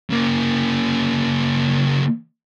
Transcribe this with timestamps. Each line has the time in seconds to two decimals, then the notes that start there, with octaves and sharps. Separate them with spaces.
0.10 C#3 A#3